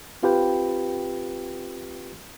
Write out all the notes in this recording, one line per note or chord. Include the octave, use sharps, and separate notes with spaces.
C4 F4 G4 B4 G5